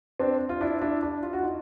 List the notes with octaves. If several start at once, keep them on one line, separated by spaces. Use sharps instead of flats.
C4 D4
F4
D4 E4
D4 E4
D4 E4
F4
F#4
D#4 F4